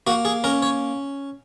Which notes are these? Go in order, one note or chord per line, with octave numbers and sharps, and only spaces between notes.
A#3 F#4
G#4
C#4 A#4
C#5